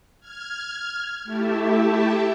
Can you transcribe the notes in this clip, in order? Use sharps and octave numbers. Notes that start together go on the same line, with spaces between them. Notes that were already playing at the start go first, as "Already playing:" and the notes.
F6 G#6
A3 E4 G4 E5 A5